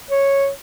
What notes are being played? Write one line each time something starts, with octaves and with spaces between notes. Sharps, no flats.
C#5